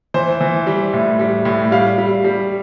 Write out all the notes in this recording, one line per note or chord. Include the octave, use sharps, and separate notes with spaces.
E3 C5
E3
G3
A2
G3
A2
G3 F5
G3
G3